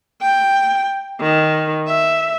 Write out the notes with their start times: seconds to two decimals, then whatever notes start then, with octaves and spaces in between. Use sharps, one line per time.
0.22 G5
1.20 D#3
1.88 E5